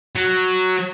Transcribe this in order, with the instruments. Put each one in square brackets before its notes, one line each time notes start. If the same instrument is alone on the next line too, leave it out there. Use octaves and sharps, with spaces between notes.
[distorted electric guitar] F#3